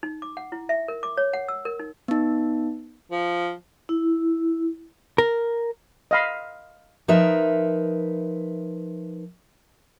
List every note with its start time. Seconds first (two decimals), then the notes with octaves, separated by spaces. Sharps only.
0.03 D#4
0.22 D6
0.37 F#5
0.52 E4
0.69 E5
0.88 A#4
1.03 D6
1.17 C#5
1.33 F#5
1.48 E6
1.65 A#4
1.79 D#4
2.08 B3 D#4
3.11 F3
3.89 E4
5.18 A#4
6.11 D#5 F5 B5
7.08 F3 D#4 A#4 B4 E5